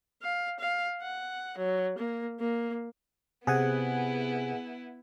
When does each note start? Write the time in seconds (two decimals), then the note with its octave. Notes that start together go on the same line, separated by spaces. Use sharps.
0.22 F5
0.59 F5
1.02 F#5
1.58 F#3
1.97 A#3
2.40 A#3
3.47 C3 B3 E4 G#4 F#5 G#5